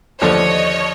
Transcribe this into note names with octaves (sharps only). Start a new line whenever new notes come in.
D#2 D3 F3 A3 D4 C#5 D#5